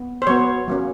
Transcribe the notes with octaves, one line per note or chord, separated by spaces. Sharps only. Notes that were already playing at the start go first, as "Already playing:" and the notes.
Already playing: B3
C5
F#3 B3 C#5
F#3 A#3 C#4